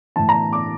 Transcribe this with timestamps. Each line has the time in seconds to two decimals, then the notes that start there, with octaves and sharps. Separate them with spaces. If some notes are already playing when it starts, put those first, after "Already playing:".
0.16 A2 E3 A5
0.29 A#5
0.53 D6